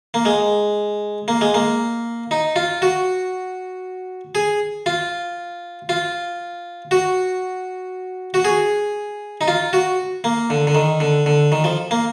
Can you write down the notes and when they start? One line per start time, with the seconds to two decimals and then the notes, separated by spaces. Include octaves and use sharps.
0.14 A#3
0.25 G#3
1.28 A#3
1.41 G#3
1.54 A#3
2.31 D#4
2.56 F4
2.82 F#4
4.35 G#4
4.86 F4
5.89 F4
6.91 F#4
8.34 F#4
8.45 G#4
9.41 D#4
9.48 F4
9.73 F#4
10.24 A#3
10.50 D3
10.67 D3
10.75 D#3
11.00 D3
11.26 D3
11.52 D#3
11.64 F3
11.91 A#3